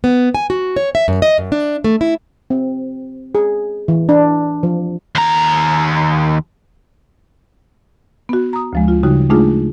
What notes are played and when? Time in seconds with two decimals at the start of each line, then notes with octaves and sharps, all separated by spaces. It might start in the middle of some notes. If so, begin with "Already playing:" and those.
0.04 B3
0.35 G#5
0.50 F#4
0.76 C#5
0.95 E5
1.08 F#2
1.22 D#5
1.38 F#2
1.52 D4
1.84 A3
2.01 E4
2.50 C4
3.35 G#4
3.88 E3
4.09 D4
4.63 F3
5.15 D#2 A#5
8.29 B3 F#4
8.53 A#5 D#6
8.73 D2 F3 G#3
8.88 F4
9.03 C#3 G3 D#4 F#4
9.30 G#3 A3 D4 D#4 F4 G#4